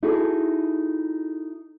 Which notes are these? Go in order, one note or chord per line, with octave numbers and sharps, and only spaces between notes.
D#4 E4 F#4 G#4 A4